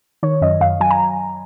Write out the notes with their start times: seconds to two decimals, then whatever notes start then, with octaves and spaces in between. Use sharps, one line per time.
0.23 D#3 C#5
0.42 F#2 D#5
0.61 F#2 F5
0.80 F#3 G#5
0.91 A#5